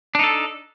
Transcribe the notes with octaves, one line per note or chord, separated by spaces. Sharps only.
D4 D#4 A4